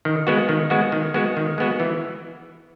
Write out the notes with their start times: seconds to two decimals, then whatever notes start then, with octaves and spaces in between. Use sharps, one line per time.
0.05 D#3
0.27 G#3 B3 F#4
0.49 D#3
0.70 G#3 B3 F#4
0.92 D#3
1.14 G#3 B3 F#4
1.37 D#3
1.58 G#3 B3 F#4
1.80 E3